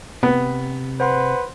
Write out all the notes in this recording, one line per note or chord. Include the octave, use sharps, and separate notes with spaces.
C3 B3
B4 C5 F#5 C6